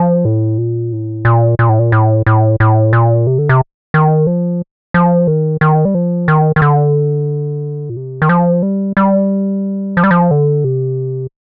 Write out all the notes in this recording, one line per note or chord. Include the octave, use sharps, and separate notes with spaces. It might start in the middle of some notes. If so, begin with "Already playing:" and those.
Already playing: F3
A2
A#2
A2
A#2
A#2
A2
A#2
A2
A2
A2
A#2
C3
D3
C3
D#3
F3
F3
D#3
D#3
G3
F3
D#3
D#3
D3
A#2
C3
D#3
F3
G3
G3
F3
G3
F3
D3
C3